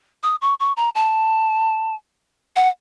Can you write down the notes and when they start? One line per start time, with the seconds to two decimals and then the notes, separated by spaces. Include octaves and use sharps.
0.23 D#6
0.41 C#6
0.60 C#6
0.77 A#5
0.95 A5
2.56 F#5